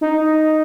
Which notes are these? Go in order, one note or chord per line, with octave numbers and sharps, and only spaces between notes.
D#4